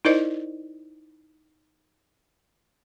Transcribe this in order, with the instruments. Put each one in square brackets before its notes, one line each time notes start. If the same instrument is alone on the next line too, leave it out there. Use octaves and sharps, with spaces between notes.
[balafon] D#4 E4 A#4 C5 D5 D#5